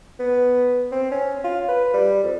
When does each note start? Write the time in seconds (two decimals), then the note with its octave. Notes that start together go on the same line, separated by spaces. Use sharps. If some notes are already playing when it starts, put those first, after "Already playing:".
0.19 B3
0.92 C4
1.11 C#4
1.44 F4
1.68 B4
1.94 G3
2.24 F2